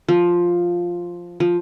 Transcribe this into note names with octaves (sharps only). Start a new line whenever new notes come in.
F3
F3